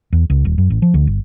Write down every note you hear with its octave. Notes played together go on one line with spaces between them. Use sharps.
E2
C#2
D#1
F#2
A1
F3
D2
G1